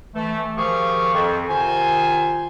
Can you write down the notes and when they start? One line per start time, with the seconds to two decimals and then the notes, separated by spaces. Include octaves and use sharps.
0.14 E3 A3
0.57 D#3 F3 G4 G#4 F5 C#6
1.13 F2
1.49 C3 D#3 F4 C5 G#5